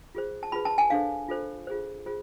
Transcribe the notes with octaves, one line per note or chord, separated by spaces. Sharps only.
F4 G#4 C5
A5
F4 G#4 B4 B5
A5
G#5
D4 A4 C5 F5
F4 A4 C5
F4 G#4 C5
F4 G#4 C5